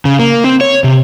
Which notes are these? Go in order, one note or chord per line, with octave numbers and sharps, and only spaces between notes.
C#3
A#3
C4
C#5
C3